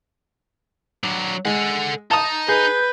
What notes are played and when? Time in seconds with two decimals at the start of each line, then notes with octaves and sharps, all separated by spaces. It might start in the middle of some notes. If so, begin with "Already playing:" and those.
1.03 F#3 D4
1.45 G#3 A4 F#5
2.11 D#4 A5 D#6
2.48 G#4 B4 G6